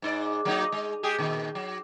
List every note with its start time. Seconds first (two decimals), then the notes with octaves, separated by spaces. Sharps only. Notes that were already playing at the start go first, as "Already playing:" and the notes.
0.02 G#2 D#4 D5
0.45 F#3 A#3 D#4
0.72 G#3
1.03 G#3 G4 G#4
1.19 A#2 D#3
1.55 F#3